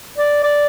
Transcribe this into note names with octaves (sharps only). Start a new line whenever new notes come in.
D5
D5